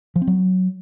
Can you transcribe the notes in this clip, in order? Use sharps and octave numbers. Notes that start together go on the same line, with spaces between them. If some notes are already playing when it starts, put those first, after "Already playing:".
F3
C4
F#3